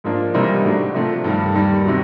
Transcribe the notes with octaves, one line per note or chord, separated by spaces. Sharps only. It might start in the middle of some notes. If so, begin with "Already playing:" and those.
G#2 F3 A#3 D4
C3 E3 G3 A#3 D#4
A2 F#3 A3 D4
C3 F3 A3
G2 D#3 G3
D#2 D#3 G3
C3 D#3 F#3